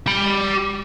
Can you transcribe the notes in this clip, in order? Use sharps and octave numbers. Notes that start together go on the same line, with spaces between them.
G4 B5